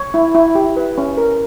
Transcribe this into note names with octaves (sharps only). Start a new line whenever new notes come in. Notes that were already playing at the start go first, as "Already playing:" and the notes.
Already playing: C#5
E4
E4
G4
B4
C#4
A#4